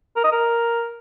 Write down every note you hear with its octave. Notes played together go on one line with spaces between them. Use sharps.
A#4
D#5
A#4